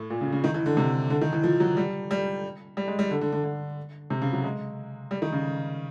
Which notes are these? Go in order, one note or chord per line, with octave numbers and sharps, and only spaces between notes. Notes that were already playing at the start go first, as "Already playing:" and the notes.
Already playing: A2
A#2
C#3
C#3
D#3
E3
D3
C3
D3
D#3
E3
F3
F#3
G3
G3
G3
G#3
G3
D3
D3
D3
D3
C3
C#3
F#3
G#3
G3
D#3
C#3